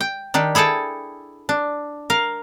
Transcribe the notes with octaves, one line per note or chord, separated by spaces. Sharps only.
G5
D#3 D4 G4
E4 G#4 A4 G5 A5
D4
A#4 F5